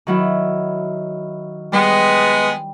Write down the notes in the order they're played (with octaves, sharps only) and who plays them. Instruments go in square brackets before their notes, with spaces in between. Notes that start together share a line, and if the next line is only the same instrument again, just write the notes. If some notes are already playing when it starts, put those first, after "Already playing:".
[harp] D#3 F#3 E4
[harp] G3 [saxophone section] G#3 B3